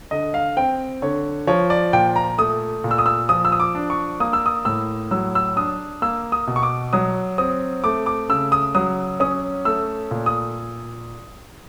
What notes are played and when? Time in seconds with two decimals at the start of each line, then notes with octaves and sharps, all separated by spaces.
0.11 D3 D#5
0.34 F5
0.57 C4 G5
1.02 D3 C#5
1.47 F3 C#5
1.70 D5
1.93 A#2 G5
2.16 A#5
2.38 A3 D#6
2.84 A#2
2.91 E6
2.98 D#6
3.06 E6
3.29 F3 D#6
3.45 E6
3.52 D#6
3.60 D6
3.75 D4
3.90 C#6
4.20 A#3 D#6
4.33 E6
4.46 D#6
4.65 A2 E6
5.11 F#3 E6
5.35 E6
5.56 D4 D#6
6.02 A#3 E6
6.32 D#6
6.47 B2
6.56 C#6
6.63 D6
6.93 F#3 D#6
7.38 C4 D#6
7.84 A3 D6
8.06 D6
8.30 C#3 E6
8.52 D#6
8.75 F#3 D#6
9.20 C#4 D#6
9.65 A3 E6
10.11 A#2
10.26 D#6